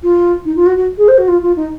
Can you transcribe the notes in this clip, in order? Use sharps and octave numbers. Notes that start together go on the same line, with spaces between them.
F4
D#4
F4
F#4
F#4
G#4
C5
F#4
F4
F4
D#4